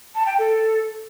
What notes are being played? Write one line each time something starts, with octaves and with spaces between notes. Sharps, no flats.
A5
G5
A4